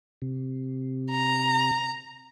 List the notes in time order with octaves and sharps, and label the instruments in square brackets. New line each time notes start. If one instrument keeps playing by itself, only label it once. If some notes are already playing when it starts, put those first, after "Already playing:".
[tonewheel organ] C3
[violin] A#5